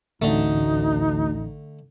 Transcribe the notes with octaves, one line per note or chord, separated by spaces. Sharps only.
A1 D2 D3 A3 D#4